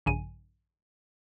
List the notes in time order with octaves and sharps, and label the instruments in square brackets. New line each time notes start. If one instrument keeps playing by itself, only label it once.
[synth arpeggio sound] A#1 G2 C#3 G#5 D#7